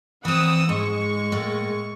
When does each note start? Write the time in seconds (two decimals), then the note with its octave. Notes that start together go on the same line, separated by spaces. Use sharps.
0.25 E3 C4 F#5 D#6 E6
0.69 G#2 G#3 C#6
1.32 A2 A#3